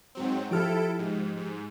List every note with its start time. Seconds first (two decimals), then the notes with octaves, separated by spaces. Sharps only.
0.15 G#2 F#3 C4
0.51 F3 E4 G4 A4 F6 D7
0.99 G#2
1.37 G#2